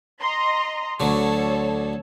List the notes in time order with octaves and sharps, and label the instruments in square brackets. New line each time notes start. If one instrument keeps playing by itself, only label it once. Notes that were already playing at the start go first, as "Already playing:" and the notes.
[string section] D#5 A#5 C6
[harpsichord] D2 D3 F#3 [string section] A4 C#5